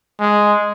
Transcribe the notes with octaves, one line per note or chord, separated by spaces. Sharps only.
G#3